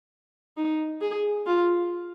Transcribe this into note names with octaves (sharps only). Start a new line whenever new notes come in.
D#4
G#4
F4